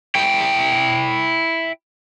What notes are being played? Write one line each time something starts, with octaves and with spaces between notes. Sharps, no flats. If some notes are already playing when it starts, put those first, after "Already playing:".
E4 G5